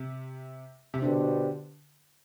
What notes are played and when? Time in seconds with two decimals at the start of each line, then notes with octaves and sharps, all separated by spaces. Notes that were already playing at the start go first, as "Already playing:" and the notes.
Already playing: C3
0.94 C3
1.02 B2 D3 B3 D4 G4 C5